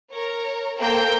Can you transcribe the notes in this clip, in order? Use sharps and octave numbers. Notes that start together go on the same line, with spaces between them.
A#4 C#5
A#3 A4 C5 G5 G6